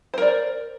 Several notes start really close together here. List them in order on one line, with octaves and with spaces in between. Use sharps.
C5 A#4 D5